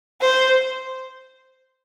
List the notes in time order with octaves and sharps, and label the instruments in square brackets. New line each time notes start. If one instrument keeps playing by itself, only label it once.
[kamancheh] C5